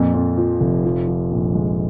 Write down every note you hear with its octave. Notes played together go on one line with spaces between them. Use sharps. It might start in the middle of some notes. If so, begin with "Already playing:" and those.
Already playing: F2 A#2
F2
F3
F1
F3
F3
A#1
G#3